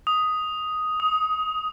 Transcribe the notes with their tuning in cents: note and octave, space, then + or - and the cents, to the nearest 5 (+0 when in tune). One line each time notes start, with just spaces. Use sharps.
D#6 +5
D#6 +20